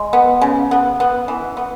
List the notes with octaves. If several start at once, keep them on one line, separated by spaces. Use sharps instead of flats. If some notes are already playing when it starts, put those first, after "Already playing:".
Already playing: G#3
B3
C#3
B3
B3
E3
B3